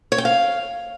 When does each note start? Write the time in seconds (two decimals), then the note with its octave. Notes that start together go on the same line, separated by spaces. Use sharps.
0.12 C#5
0.18 G5
0.25 F5